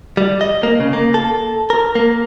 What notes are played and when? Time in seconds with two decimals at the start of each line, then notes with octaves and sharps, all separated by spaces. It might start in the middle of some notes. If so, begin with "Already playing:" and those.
0.17 G3
0.41 D#5
0.63 A#3
0.80 C#3
0.93 A#3
1.14 A4
1.70 A#4
1.95 A#3